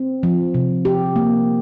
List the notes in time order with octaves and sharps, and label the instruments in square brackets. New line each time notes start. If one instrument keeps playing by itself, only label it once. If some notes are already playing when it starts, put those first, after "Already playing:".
Already playing: [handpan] C4
F3
C3
G4
A#3